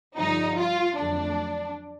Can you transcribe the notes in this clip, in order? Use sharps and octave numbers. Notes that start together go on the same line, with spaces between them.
G2 D3 F3 D#4
F4
F2 D3 F#3 A3 D4